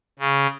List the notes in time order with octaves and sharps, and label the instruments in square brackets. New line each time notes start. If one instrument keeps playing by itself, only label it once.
[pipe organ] C#3